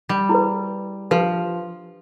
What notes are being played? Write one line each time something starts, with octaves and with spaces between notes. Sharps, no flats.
G3
E4 G#4 B4
F3 D4 G4 B4